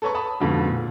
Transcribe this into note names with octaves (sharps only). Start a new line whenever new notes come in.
A4 B4 C#5 A#5 C#6
A5 B5 D#6
F2 G#2 B2 D3
A#2